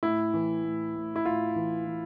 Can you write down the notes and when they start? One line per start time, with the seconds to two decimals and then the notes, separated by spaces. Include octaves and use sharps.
0.03 A2 E4
0.34 E3
0.64 A2
0.95 A2
1.16 E4
1.25 A2 F4
1.56 E3
1.87 E3